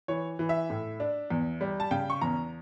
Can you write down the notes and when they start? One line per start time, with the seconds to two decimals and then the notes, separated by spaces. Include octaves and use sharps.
0.08 E3 C#5
0.39 E3
0.49 E5
0.70 A2
1.00 D4
1.30 E2
1.61 G3
1.80 A5
1.91 C#3 G5
2.10 C#6
2.21 E2 A#5